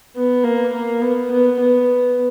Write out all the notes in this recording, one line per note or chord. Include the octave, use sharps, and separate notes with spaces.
B3
A#3
A#3
B3
B3
B3